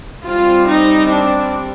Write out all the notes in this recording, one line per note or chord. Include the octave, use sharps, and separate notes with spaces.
G3 C4 F4
D#4
D4